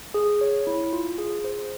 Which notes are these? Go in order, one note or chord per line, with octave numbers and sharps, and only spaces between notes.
G#4
C#5
E4
F4
G#4
C5